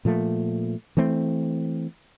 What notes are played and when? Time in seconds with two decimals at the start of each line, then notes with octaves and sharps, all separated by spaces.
0.05 A#2 F3 A3
0.97 E3 A3 C4